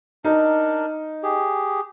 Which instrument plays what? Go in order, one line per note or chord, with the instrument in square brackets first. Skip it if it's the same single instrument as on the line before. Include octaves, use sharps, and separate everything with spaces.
[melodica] D4 A#4 [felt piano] D#4
[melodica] G4 G#4